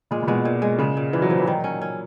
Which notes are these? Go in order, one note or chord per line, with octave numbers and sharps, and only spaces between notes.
A#2 G#3
A#2
B2 G#3
A#2
G#3
C#3 G#3
A#2
A#2 E3
F#3
A#2 F3
E3
D#3 F#3
C#4
C#4